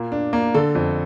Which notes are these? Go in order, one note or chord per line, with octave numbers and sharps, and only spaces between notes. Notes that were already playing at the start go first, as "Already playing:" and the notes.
Already playing: A#2 A#3
D4
A#3
D3 A4
F2